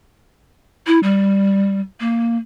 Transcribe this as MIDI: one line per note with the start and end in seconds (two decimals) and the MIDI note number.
0.87 0.99 64
1.03 1.80 55
2.00 2.37 58